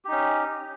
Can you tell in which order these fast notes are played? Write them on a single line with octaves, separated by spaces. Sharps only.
G4 D#4 C#4